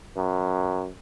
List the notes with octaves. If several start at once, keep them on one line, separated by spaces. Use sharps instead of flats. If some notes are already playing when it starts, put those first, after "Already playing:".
F#2